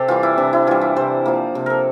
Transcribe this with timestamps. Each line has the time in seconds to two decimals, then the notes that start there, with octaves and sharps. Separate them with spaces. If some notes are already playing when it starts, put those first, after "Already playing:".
Already playing: C3 G4 A4 C5
0.08 E3 G3 F4
0.23 E4
0.38 C3 D4
0.53 E4
0.67 E3 G3 F4
0.81 E4
0.96 C3 C5
1.26 F3 A#3
1.55 C3
1.66 A4 A#4